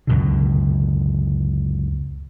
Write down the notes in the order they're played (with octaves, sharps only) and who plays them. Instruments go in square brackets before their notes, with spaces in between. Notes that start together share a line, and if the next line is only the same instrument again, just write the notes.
[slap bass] C#2 F#2 B2 D3